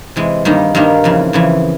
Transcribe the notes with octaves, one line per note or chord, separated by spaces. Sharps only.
C3 E3 G#3
G2 D#3 G3 A#3 D#4
G2 D#3 G3 A#3 D#4
F2 C#3 E3
F2 C#3 E3